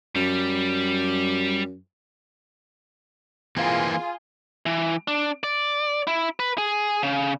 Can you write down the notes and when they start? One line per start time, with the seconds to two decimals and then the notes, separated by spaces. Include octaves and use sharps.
0.16 F#2 G3
3.57 E3 A#3 C4 F4 G#4
4.66 E3
5.08 D4
5.43 D5
6.07 E4
6.39 B4
6.58 G#4
7.03 C#3